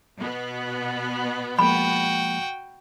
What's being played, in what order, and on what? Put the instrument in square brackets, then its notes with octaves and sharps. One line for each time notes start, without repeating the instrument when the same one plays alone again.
[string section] B2 B3
[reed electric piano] F3 G#3 A#3 [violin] F#4 G5 [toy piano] B5